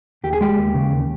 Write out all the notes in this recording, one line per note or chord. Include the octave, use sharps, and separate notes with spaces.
D#2 G4
G#4
G#3 G4
D#2
C#3
D#2